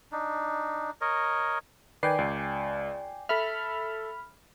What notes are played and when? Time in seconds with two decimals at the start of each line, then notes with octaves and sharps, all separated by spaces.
0.12 D4 D#4
1.01 A#4 C#5 D#5
2.03 D#3 B4 D5 G5 G#5 C7
2.19 C#2
3.29 A4 E5 B5 F6